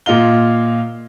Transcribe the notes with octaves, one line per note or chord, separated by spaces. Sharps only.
A#2 F4 D#5 F5 G7